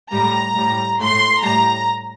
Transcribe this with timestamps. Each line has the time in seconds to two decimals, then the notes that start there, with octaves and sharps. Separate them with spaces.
0.12 A2 G3 A#5
0.56 A2 G3
0.99 A2 A3 C6
1.43 A2 G3 A#5